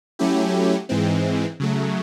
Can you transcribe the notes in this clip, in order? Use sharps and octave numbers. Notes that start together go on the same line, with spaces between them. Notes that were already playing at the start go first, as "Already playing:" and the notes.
F#3 A3 C#4 E4 G4
G#2 E3 G#3 C4
C#3 F#3 A3